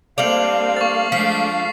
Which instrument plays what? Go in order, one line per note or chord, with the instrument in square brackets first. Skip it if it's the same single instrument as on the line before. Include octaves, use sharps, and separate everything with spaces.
[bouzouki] G3 A3 D4 [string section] A#3 C4 [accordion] F5 [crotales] F7 F#7
[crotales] C#6 A6
[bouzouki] F3 [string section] G#3 A3 D4 [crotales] B6 C7